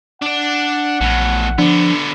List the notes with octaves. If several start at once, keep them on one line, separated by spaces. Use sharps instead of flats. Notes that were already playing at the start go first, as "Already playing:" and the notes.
D4 D5 F#5
A#1 E2 A2
D3 F3 B3 D4